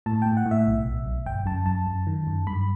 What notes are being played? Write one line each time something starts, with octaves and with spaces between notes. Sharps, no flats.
A2 A5
A2 G5
F#5
A2
E5
B1
B1
B1
G1 G5
F#2 A5
F#2 A5
F#2
D#3
F#2
G2 B5